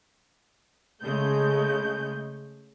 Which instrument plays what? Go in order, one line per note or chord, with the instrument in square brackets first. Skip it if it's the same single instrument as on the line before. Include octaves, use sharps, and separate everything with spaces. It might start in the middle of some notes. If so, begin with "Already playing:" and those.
[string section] C#3 G#3 A3 G6